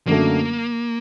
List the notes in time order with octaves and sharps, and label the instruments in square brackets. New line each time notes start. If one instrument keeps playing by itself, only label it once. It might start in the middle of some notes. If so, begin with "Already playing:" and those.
[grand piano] F#2 D3 F#3 A3 [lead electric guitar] A#3